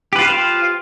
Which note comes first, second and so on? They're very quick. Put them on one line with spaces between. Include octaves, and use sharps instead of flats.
G4 B4 F4 C5 F5